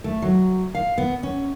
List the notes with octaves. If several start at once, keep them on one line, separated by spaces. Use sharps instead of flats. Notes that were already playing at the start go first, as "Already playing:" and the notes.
A3
F#3
F5
B3
C#4